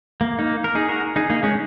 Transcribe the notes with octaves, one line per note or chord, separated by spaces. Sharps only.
A#3
A#3 D#4
A#4
D#4 G#4
F#4 A#4
D#4 G#4
A#3 D#4
G#3 C#4